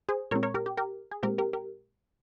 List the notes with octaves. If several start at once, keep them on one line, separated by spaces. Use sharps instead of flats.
G#4 C5
A#2 G#3 C4 A#4 C#5
A#4 C#5
G4 A#4
G4
G4 A#4
G#4
A#2 G#3 C4 G4 A#4
G4 A#4
G4 A#4